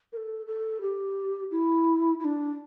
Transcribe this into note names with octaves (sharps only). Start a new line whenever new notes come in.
A#4
A4
A4
G4
E4
E4
D4